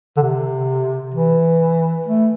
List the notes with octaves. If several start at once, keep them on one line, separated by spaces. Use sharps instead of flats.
D3
C3
E3
A3